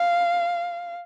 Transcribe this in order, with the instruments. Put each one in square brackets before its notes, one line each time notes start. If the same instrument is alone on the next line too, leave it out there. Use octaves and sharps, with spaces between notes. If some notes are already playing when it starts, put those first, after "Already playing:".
Already playing: [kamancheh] F5